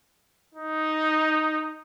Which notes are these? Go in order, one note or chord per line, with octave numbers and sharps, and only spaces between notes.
D#4